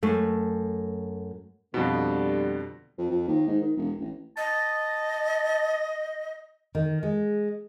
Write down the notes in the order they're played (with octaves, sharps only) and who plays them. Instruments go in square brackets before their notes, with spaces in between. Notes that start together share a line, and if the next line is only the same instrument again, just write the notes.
[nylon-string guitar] F#2 A3
[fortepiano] F2 B2 [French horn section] D3 G3
[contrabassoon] F2
F2
D#2
G#2
D#3
E1
A1
[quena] D#5 [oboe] A5
[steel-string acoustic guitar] D#3
G#3